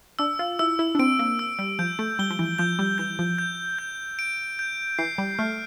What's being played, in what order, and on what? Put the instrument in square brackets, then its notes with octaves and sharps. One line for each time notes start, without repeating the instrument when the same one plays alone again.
[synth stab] D4 [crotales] E6
[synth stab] F4
[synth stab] E4 [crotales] E6
[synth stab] E4
D4
[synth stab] C4 [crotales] D7
[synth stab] A#3
[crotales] E6
[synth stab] G3
[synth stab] F3 [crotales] G6
[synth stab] A3
[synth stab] G3 [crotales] G7
[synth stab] F3
E3
[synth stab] F3 [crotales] G6
[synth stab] G3
[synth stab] E3 [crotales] G6
[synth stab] F3
[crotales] G6
G6
D7
G6
[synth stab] E3 [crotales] C7
[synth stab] G3
[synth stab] A3 [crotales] F6